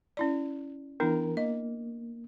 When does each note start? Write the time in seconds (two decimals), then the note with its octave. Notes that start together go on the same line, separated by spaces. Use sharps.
0.17 C#4 E4 D5
1.00 E3 B3 D4 E4 A#4
1.37 A#3 D#5